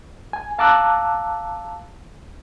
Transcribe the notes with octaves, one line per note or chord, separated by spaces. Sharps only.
G#5
F5 A5 A#5 D6 E6 F#6